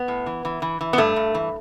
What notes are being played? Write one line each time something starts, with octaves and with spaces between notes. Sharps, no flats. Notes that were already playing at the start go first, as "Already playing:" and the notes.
Already playing: B3
A2
E3
E3
E3
E3
B3
G2 A3
G2
E3